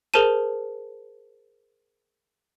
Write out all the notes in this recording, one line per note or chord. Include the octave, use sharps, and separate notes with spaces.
G#4 A#4 C5 A5 D#7